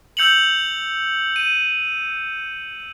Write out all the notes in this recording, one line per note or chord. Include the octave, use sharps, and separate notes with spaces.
E6 G6 C#7 F7 F#7
D#7